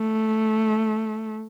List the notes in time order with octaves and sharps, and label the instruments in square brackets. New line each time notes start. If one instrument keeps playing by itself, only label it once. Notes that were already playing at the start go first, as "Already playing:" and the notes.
Already playing: [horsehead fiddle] A3